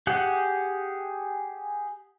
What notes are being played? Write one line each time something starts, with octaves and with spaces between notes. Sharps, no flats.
G4 G#4 F#5